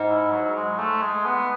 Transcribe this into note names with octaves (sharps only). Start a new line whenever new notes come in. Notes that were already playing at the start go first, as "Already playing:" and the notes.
Already playing: G#2
E4
F#3
G#3
A3
G#3
B3